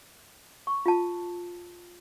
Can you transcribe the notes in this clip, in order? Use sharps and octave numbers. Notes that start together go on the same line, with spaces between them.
C#6
F4 A5